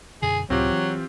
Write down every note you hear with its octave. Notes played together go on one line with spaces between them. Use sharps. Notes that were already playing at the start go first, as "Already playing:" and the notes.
F#2 B2 D3 G#4
C#2 A2 C3 F#3 C4 F4 G4
E3